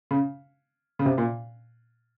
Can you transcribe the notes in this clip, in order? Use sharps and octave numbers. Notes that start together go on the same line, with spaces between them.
C#3
C#3
C3
A#2